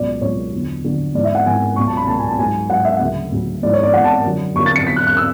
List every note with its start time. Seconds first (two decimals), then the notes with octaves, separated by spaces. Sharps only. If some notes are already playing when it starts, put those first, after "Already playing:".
Already playing: C#2 B2 F#3 D5
0.21 C#2 B2 F#3 C#5
0.53 E2 D3 F#3
0.84 E2 D3 F#3
1.14 G#2 E3 D5
1.25 E5
1.35 F#5
1.46 G#2 E3 G#5
1.76 C#2 B2 F#3 C#6
1.87 A5
1.97 B5
2.07 C#2 B2 F#3 A5
2.19 G#5
2.28 A5
2.39 G#2 F#3 G#5
2.70 G#2 F#3 F#5
2.85 E5
2.93 F#5
2.99 D2 C#3 F#3 E5
3.32 D2 C#3 F#3
3.62 G#2 E3 D5
3.73 C#5
3.83 D5
3.94 G#2 E3 F#5
4.04 A5
4.24 F#2 D3 F#3
4.55 F#2 D3 F#3 C#6
4.66 A6
4.76 C#7
4.87 E2 D3 F#3 B6
4.96 F#6
5.07 F#6
5.17 E6